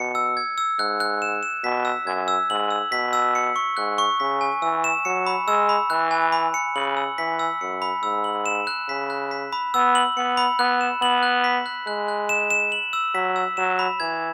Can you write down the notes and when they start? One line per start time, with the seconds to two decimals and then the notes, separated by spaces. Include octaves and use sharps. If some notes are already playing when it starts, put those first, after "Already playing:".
Already playing: B2 C#7
0.15 E6
0.37 G#6
0.58 E6
0.79 G#2 F#6
1.00 F#6
1.22 E7
1.43 E7
1.64 B2 B6
1.85 E6
2.06 F#2 G#6
2.28 E6
2.50 G#2 F#7
2.71 E6
2.92 B2 B6
3.13 E6
3.35 C#7
3.56 C#6
3.77 G#2 F#6
3.98 C#6
4.20 C#3 B6
4.41 G#5
4.62 E3 E6
4.84 E7
5.05 F#3 C#7
5.26 B5
5.47 G#3 E6
5.69 B5
5.90 E3 F#6
6.11 G#5
6.32 B5
6.54 C#7
6.76 C#3 F#7
6.97 E6
7.18 E3 B6
7.39 E6
7.61 F#2 C#7
7.82 B5
8.03 G#2 E6
8.24 F#7
8.46 E7
8.67 F#6
8.89 C#3 B6
9.10 F#6
9.31 B6
9.53 B5
9.74 B3 E6
9.95 F#7
10.17 B3 C#7
10.37 B5
10.59 B3 F#6
10.81 E7
11.02 B3 F#7
11.23 F#6
11.44 B6
11.66 F#6
11.87 G#3 F#6
12.08 F#6
12.29 E7
12.51 E7
12.72 F#7
12.93 E6
13.14 F#3 B6
13.36 E6
13.57 F#3 E7
13.79 B5
14.00 E3 G#6